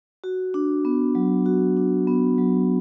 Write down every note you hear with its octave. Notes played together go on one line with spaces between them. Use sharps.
F#4
D4
B3
F#3
F#4
D4
B3
F#3